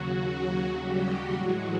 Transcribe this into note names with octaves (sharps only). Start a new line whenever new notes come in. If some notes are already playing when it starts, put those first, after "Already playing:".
Already playing: D#2 C#3 F#3 F#4
G3 G4
A2 E3 F#3 G#3 F#4